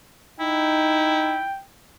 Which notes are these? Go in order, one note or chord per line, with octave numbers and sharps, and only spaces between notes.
D#4 E4 G5